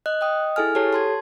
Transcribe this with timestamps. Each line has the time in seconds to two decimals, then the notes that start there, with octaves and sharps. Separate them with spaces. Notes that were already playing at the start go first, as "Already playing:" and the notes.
0.06 D#5 F#6
0.21 D#5 G5 D#6
0.56 E4 G#4 A4 G#5 F6
0.75 G4 A4 C#5 A5 C7
0.93 A5 C6 G#6